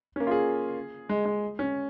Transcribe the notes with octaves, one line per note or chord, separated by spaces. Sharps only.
C#4
A#3
F4
G#4
G#3
G#3
C#4